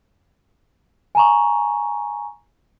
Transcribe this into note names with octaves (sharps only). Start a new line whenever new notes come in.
G#5 A#5 C#6